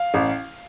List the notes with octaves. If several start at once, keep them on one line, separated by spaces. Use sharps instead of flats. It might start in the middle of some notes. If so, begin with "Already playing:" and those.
Already playing: F5
A1